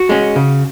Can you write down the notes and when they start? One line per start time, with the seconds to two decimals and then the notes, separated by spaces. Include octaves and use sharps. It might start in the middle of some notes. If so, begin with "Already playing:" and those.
Already playing: F#4
0.09 G#3 C#4
0.36 C#3